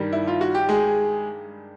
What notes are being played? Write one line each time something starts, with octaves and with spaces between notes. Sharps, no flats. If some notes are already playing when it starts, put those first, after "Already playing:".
Already playing: G2 D#3 G3
E4
F4
F#4
G4
G#3 G#4